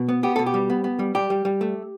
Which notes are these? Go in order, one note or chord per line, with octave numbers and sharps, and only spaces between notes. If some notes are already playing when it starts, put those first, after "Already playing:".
Already playing: B2
B3
B3 G4
B2 A4
G4
G3
B3
B3
G3
G3 G4
G3
G3
A3